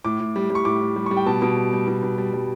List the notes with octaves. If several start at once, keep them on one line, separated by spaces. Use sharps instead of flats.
A2 D6
A2
G3
G3 C#6
A2 D6
A2
G3
G3 C#6
G5
B2 A5
B2
G3
G3
B2
B2
G3
G3